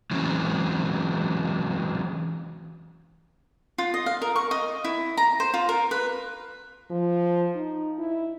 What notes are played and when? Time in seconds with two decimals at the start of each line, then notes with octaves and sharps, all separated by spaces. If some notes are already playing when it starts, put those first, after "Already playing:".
0.11 E3 F#3 G#3 C4 C#4
3.78 F4
3.94 D#5
4.06 F5
4.22 A#4
4.36 C#6
4.51 D#5
4.84 E4
5.17 A#5
5.40 C5
5.54 F4
5.69 A#4
5.91 B4
6.90 F3
7.56 D#4
7.99 E4